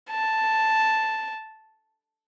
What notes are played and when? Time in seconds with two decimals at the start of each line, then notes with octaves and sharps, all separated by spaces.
0.10 A5